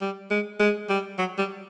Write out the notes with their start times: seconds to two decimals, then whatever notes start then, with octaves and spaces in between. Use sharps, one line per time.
0.01 G3
0.30 G#3
0.60 G#3
0.89 G3
1.18 F#3
1.38 G3